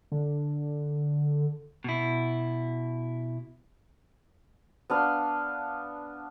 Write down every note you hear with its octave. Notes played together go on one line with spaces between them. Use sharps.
D3
B2 E4
B3 D4 F5